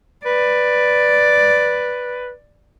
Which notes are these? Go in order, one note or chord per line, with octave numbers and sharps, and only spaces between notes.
B4 D5